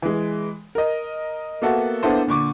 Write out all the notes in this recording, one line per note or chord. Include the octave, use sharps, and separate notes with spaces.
E3 G#3
A#4 D#5
A#3 B3 F#4 A4 E5
A#3 B3 D4 E4 A4 C5
A#2 D3 C#6 D6